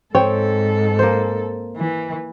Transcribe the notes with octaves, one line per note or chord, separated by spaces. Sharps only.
G#2 C4 A4 C#5 G5
A#3 C5
E3